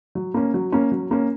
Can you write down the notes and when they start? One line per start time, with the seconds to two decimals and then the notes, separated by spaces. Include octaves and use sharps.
0.15 F#3
0.34 A#3 C#4
0.54 F#3
0.72 A#3 C#4
0.92 F#3
1.11 A#3 C#4